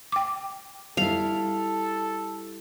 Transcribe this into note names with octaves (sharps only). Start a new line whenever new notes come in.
G5 D6
G3 E4 A4 F5